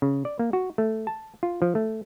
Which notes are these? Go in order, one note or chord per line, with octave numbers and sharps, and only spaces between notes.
C#3
D5
A#3
F#4
A3
A5
F4
F3
A3